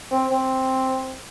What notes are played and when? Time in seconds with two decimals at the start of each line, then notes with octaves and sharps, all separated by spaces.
0.11 C4
0.31 C4